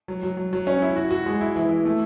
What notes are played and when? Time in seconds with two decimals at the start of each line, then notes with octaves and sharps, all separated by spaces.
0.08 F#3
0.23 F#3
0.37 F#3
0.53 F#3
0.67 C#4
0.82 E4
0.96 F#4
1.11 F#4
1.26 G#3
1.41 E4
1.56 E3
1.69 E4
1.85 A3